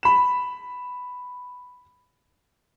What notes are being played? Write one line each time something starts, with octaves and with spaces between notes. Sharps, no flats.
B5 E7